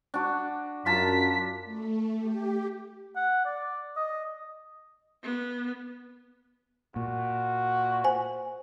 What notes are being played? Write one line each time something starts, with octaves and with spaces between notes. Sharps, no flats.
D4 F#4
F#2 F4 A5 A#5 B6
A3
G4
F#5
D5
D#5
B3
A#2 F#4
C5 G#5